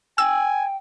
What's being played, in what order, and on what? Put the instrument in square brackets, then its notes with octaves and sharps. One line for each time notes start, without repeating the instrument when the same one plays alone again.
[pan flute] G5 [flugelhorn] G#5 [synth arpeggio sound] E6